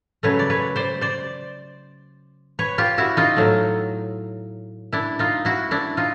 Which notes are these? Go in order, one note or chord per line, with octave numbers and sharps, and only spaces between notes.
C#3 F#3 A3 B4 C#5
D5
B4 C#5
C5 D5
C5 D5
B4 C#5
F4 G4
E4 F#4
D#4 F4
A2 F#3 A3
D4 E4
D#4 F4
E4 F#4
D4 E4
D#4 F4